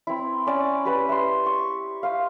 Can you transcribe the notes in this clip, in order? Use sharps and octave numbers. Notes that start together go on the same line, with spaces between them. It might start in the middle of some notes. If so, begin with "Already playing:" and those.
C4 E4
C#4 D5 G#5
G4 B4 B5
E5 C6
C#6
C5 E5 F5